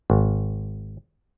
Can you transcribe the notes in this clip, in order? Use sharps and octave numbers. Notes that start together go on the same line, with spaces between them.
G#1